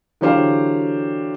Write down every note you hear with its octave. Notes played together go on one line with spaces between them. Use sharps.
D3 E3 F#3 G4 C5 F5